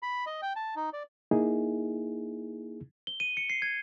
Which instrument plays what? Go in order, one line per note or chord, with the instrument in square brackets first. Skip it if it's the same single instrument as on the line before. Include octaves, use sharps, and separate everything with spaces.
[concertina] B5
D#5
G5
A5
D#4
D5
[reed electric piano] A#3 D#4 E4 G#4
[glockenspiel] G7
D#7
C#7
C7
G#6